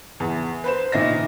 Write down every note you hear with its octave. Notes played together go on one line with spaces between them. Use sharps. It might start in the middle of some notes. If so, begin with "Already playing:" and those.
E2
B4 C5 E7
A#2 D#3 D#5 E5 A#6